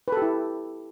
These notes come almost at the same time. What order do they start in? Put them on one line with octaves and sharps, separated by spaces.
B4 A4 G4 E4